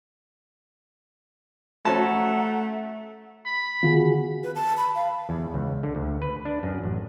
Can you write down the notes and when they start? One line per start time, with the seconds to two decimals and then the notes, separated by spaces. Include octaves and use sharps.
1.85 A3 C#4 F#4 F#5 A5 A#5
3.46 B5
3.83 D3 D#3 B3 F4 F#4 G#4
4.43 B4
4.55 A5
4.77 B5
4.95 F5
5.29 E2
5.54 C#2
5.83 D3
5.95 D2
6.22 B4
6.45 D4
6.63 F#2
6.84 A1